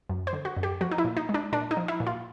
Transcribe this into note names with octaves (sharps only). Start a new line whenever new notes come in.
F#2
C5
D3
F#4
F#2
G4
F3 F#4
D#4
E4
A#2
D#4
G#3
D4
A#2 D4
D#4
F3
E4
A#2
F4